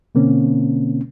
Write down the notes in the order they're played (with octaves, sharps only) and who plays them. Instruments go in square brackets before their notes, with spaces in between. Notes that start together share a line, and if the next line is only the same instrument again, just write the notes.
[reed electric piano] B2 D3 A#3 C4 C#4